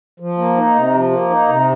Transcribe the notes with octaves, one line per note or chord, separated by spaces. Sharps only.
F3
A#3
D#4
C3
F3
A#3
D#4
C3